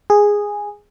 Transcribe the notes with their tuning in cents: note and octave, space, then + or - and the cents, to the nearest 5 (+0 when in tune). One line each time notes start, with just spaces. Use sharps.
G#4 -10